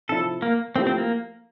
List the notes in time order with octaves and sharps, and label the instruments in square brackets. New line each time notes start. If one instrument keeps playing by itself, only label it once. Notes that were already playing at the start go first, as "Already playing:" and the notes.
[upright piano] C3 F3 C4 E4 [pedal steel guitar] A4
[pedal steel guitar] A#3
[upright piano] F3 A3 E4 G4 [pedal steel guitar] C4
[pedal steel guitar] C4
A#3